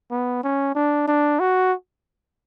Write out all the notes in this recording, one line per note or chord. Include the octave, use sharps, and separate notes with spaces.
B3
C#4
D4
D4
F#4